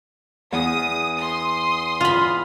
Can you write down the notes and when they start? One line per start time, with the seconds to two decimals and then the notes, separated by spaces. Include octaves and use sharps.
0.52 E2 D#6
1.17 C6 D#6
2.01 F4 B5